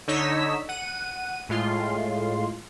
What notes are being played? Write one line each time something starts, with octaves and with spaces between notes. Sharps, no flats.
D3 D#4 C#5 D#5 E6 B6
F#5 D#7
A2 G#3 F4 C6